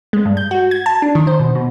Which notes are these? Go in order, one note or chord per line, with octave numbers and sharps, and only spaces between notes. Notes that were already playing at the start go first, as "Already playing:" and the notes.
G#3
G2
G6
F#4
G#6
A5
D4
D#3
C5
B2
B2